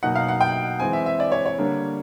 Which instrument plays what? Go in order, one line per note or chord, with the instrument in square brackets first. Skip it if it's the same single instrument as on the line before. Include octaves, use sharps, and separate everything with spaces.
[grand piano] B2 F#3 A#3 D#4 [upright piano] F#5
[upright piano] F5
F#5
G5
[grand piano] E3 G#3 C4 [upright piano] G#5
[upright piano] E5
E5
D5
C#5
C#5
[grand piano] D3 G3 A#3 D4